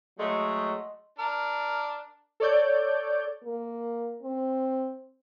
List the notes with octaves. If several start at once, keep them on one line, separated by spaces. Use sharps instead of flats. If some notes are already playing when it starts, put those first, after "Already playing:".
F#3 G#3 A3 D#5 C6
D4 A#4
A4 C#5 D5 G6
A#3
C4